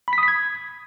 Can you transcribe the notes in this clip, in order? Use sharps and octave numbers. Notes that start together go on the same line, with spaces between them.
B5
B6
D#6
B6
G#6